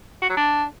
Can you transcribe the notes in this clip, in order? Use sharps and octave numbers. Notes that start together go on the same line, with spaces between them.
F#4
F#3
D4